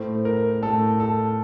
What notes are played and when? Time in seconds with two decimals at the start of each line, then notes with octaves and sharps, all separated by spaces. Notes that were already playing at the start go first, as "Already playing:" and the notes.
Already playing: A2 A3 C5
0.25 A#4
0.62 A2 A3 A4
1.00 A4